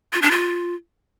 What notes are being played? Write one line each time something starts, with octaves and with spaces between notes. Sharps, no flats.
F4
D4
F4